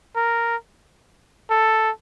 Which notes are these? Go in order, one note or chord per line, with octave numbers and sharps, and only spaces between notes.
A#4
A4